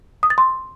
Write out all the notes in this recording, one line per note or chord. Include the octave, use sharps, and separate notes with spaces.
D#6
A6
C6